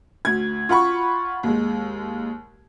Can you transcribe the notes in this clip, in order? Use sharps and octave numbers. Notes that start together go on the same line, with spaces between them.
D2 G#6
F4 F#5 B5 C#6
D#2 G#3